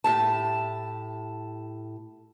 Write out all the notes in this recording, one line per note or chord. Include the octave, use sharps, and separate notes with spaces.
A2 G4 A5